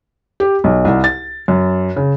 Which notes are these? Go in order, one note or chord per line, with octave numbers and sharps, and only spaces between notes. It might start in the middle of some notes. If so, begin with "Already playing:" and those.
G4
B1
C2
A6
F#2
C#3